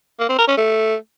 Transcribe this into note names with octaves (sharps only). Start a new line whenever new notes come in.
A#3
C4
A#4
C#4
A3